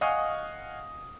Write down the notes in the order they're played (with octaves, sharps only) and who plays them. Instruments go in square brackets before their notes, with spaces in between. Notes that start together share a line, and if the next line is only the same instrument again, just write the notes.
[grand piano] D#5 F5 F#5 G#5 C#6 D#6